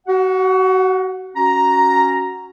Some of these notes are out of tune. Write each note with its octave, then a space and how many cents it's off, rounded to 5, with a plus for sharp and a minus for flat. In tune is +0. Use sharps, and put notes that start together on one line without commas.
F#4 +30 F#5 -20
C#4 +0 F#4 +0 A#5 +5